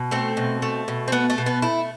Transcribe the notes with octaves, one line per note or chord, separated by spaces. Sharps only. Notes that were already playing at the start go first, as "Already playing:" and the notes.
Already playing: B2
A3 C4
B2
A3
B2
C4
A3 B3
A3
B2
B3
A3 E4